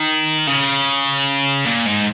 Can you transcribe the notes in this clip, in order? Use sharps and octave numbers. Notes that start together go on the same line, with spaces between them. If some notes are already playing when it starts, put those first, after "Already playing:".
Already playing: D#3
C#3
A#2
G#2